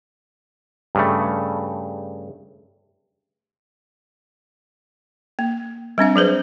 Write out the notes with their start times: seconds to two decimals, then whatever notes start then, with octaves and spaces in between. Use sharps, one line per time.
0.95 G2 C#3 A3
5.39 A#3
5.98 G3 C4 D4 F5
6.16 F#3 G#4 B4 C5